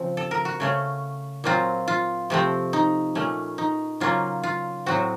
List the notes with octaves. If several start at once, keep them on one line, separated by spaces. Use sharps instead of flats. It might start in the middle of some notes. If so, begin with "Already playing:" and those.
Already playing: C#3 F3 C4
A4
A#4
F#4
C#3 A3 C#4
A#2 F#3 C4 F4
F4
C3 F3 A3 C4
D#4
A#2 A3 C#4
D#4
C#3 F#3 A#3 C#4 F4
F4
A2 F#3 C4 F#4